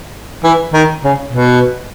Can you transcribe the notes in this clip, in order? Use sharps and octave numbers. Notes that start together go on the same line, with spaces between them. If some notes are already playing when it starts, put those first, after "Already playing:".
E3
D#3
C#3
B2